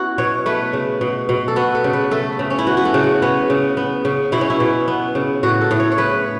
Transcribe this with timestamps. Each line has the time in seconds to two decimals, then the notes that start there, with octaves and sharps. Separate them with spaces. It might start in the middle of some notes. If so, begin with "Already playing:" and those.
Already playing: B3 C#4 E4 F#4
0.18 B2 C#5
0.46 A3 B4
0.73 C#3
1.01 B2
1.29 B2
1.48 A4
1.56 B3 F#4
1.75 A4
1.84 C#3
1.93 B4
2.11 A3 A4
2.39 C#3
2.50 C#4
2.59 E4
2.67 B3 F#4
2.77 F#4
2.85 A4
2.94 C#3
3.04 F#4
3.22 B3 C#4
3.50 C#3
3.77 B3
4.05 C#3
4.32 B2 E4
4.41 C#4
4.50 E4
4.60 B2
4.88 B3
5.15 C#3
5.43 A2 F#4
5.61 A4
5.71 A2
5.80 C#5
5.92 C#5
5.98 C#3 B4